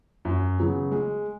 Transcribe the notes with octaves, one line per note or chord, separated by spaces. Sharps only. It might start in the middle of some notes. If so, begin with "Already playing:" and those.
F#2
C#3 F#3 B3
G#3